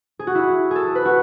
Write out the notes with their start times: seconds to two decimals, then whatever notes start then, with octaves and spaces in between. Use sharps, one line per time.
0.19 G#4
0.27 F#4
0.35 E4
0.71 G#4 A4
0.95 B4
1.05 F#4